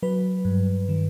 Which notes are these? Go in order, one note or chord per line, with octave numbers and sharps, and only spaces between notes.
F#3 B4
G2
D#3